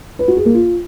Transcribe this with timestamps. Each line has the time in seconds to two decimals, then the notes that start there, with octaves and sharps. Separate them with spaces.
0.19 B4
0.28 F#4
0.37 G#4
0.45 A#3
0.54 F4